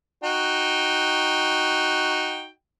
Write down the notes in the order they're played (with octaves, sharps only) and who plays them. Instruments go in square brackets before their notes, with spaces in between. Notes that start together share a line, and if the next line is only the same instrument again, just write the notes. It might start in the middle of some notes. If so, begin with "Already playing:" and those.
[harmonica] D#4 F#4 G5